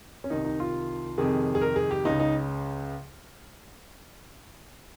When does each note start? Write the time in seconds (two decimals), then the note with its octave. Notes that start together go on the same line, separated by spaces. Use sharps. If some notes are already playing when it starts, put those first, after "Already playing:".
0.24 C#4
0.30 C2 C3 D#3 D#4
0.45 D#4
0.60 F4
1.18 F2 C3 D#3 G#4
1.55 G#4
1.62 A#4
1.76 G#4
1.91 G4
2.05 C#2 C#3 D#4
2.20 D#4